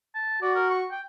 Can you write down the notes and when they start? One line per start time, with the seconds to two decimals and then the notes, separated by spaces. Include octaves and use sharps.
0.15 A5
0.42 F#4 D5
0.55 A#4
0.70 C#6
0.91 G5